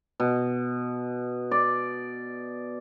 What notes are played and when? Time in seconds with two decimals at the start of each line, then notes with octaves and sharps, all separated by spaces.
0.20 B2
1.51 D5